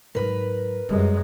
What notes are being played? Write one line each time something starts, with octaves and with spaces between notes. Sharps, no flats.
G#2 F#3 A#4 B4
F#2 G3 G#3